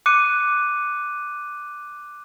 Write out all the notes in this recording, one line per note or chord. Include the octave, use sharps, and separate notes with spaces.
D6 F#6 C#7 D#7